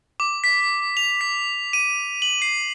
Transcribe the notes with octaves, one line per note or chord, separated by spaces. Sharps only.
D6
B6
F7
B6
D#7
F#7
C7